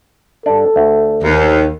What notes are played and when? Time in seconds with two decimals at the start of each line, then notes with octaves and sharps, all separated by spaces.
0.46 G2 D4 A4
0.76 D2
1.23 D#2